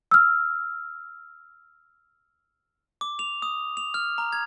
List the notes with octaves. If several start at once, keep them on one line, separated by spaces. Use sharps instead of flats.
E6 F6
D6
F7
D#6
F7
F6
A#5
G#6